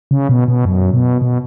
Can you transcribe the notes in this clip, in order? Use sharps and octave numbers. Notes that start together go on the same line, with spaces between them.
C#3
B2
B2
F#2
B2
B2